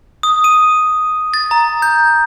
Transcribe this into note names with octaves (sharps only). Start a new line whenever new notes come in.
D#6
D#7
A6
A#5
G6